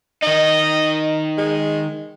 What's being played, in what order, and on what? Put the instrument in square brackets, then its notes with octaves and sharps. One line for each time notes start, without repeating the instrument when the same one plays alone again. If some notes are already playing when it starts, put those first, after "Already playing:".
[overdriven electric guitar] D#3 D#4 [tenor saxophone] D#5
[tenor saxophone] G#3